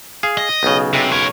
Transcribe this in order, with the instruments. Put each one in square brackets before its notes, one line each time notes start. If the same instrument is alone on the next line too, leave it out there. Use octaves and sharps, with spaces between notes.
[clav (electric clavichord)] G#4 F5
[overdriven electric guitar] D#5
[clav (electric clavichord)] B1 C#3
[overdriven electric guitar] C3
A#4 C#5